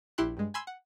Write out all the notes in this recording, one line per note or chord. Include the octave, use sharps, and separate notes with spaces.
A#1 E4 G4 C6 F#6
G2 G#3
G#5 B5 C6 E6 G#6
F#5